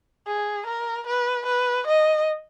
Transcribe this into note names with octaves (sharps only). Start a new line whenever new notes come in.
G#4
A#4
B4
B4
D#5